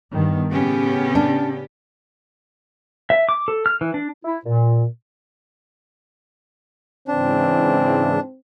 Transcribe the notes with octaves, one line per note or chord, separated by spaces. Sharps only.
G2 D#3 B3
A2 C#3 B3 C#4 G4
D4
E5
D6
A4
F6
E3
D4
E4
A#2
G#2 C#3 E3 C4 D4